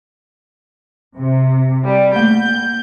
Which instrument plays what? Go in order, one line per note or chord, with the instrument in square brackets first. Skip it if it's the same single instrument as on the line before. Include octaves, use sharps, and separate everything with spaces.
[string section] C3
G3
[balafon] A3 A#3 [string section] G6